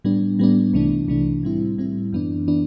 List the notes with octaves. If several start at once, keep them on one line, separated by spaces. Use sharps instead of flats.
A2 G3 B3 D4
A2 G3 B3 D4
C2 C3 E3 A3 D4
C2 C3 E3 A3 D4
A2 G3 C4 E4
A2 G3 C4 E4
F#2 E3 B3 D4
E3 B3 D4